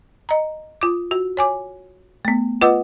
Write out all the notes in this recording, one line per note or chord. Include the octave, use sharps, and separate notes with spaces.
D#5 A#5
F4 D6
F#4
C#5 G#5 D6
A3 B3
F4 B4 D#5 F#5 D6 E6